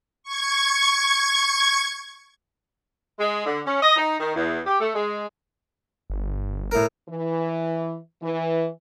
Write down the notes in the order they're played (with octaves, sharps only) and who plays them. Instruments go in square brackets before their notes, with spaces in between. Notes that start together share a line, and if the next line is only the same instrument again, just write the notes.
[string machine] C#6 G#6
[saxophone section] G#3
D3
C#4
D#5
D#4
D#3
E2
G4
A3
G#3
[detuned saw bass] G1
[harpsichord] A2 A#4
[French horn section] E3
E3